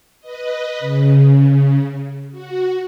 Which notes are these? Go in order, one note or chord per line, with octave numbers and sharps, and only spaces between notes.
B4 D#5
C#3
F#4